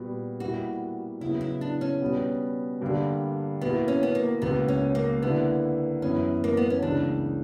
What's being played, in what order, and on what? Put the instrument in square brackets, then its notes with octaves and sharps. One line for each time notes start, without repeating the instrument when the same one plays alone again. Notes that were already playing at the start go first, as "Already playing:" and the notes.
Already playing: [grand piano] A#2 G3 B3 F#4
[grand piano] B2 G3 A#3 E4 [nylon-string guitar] F#4
[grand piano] C#3 F#3 B3 [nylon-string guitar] E4
[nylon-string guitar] E4
D4
C#4
[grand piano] B2 G3 B3
G2 D3 G3 A#3
[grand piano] B2 A#3 E4 [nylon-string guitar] B3
[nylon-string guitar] C#4
B3
A#3
[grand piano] C#2 B2 A#3 [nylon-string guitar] B3
[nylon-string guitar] C#4
A#3
[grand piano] D3 A#3 E4 B4 [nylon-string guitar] B3
[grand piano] F#2 E3 B3 E4 [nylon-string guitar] C#4
[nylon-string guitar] A#3
B3
C#4
[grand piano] C#2 C#3 E3 A#3 [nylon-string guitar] D4